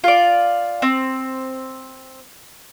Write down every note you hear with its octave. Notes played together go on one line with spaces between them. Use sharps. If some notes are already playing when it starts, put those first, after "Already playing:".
F4 D5
C4